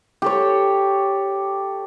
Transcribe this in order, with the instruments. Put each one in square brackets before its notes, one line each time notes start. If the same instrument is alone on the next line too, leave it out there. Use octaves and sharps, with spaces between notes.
[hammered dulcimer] G4 A4 C#5